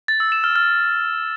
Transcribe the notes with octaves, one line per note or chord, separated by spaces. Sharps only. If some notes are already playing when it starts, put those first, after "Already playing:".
A6
E6
E7
F6
F6